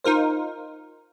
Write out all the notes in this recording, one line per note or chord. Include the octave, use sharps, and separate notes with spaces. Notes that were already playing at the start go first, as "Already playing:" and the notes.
D#4 F4 A#4 C5